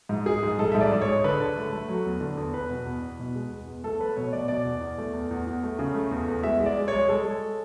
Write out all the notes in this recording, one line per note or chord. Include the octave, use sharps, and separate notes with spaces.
G#2
G#3 G#4
G#2
G#2 A4
G#2 E5
D5
G#2
C#5
G#3
D3 B4
D3
A3
A3
F#3
E2
D3
E2
E2 B4
B2
E2
E2
B2
G#3
E2
E2
A3 A4
A3 B4
B2 C#5
B2 D5
B2 D5
E2
E2
A3
E2
E2
E2
A3
C#3
A3
E2
E2
G#3 E5
G#3
D5
G#3
G#3 C#5
G#3 A4
G#3